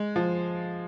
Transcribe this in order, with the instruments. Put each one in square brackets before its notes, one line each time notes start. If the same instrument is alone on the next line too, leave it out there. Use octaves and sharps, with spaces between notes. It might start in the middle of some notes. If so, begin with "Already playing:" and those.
Already playing: [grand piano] G#3
F3